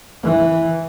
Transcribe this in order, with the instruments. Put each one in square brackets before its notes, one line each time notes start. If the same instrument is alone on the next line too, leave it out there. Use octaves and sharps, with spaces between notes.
[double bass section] E3